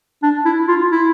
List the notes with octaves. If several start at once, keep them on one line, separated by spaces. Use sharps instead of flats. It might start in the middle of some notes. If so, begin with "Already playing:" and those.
D4
E4
F4
E4